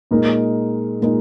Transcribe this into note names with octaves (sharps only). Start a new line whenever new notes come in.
A#2 G#3 D#4 A#4
A#2 G#3 D#4 A#4